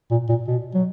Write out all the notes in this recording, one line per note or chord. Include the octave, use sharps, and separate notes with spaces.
A#2
A#2
B2
F#3